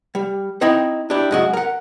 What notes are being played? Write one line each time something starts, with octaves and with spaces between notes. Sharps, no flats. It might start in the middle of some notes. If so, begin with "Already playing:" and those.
G3
C4 D#4 E4 D#5 G5 B5
D4 E4 G4
F#2 G#3 F#4
A#4 F#5